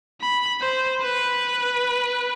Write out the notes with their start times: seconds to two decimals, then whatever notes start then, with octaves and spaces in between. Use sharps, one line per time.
0.21 B5
0.61 C5
1.02 B4